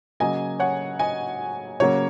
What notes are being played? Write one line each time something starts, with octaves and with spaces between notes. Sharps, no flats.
C#3 F#3 A#3 D#5 G#5
C#5 F#5
D#5 G#5
C#3 F#3 A#3 C#5